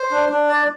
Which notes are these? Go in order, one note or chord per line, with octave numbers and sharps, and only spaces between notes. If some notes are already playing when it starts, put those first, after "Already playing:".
Already playing: C5
D4
D4
D5